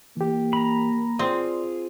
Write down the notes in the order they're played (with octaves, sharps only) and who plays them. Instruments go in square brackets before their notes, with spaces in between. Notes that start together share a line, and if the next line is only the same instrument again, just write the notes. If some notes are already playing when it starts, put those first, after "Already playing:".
[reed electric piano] E3 G4 [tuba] A#3
[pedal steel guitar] A#5 B5
[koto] C4 [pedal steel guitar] F4 G#4 [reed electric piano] D5